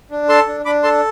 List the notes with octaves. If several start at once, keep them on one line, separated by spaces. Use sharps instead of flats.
D4
A4 A5 C6
D4
D4 B5 D6
A4 A5 C6